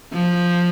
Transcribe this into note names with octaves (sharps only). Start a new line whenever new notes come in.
F3